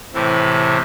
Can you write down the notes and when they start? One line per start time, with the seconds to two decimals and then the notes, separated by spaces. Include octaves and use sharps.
0.14 A2 C3 E3